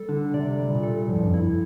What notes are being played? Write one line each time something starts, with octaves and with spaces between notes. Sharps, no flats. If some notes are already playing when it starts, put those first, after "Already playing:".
Already playing: G3 A4
D3 D4
C3 D5
G3
A#2
A4
A2 F3
G2
F2
G2 E4